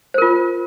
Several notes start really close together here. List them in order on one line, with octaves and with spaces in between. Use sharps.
C5 A#4 F4